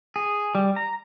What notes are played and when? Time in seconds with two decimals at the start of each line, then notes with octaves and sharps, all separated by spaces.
0.16 G#4
0.55 G3
0.76 A#5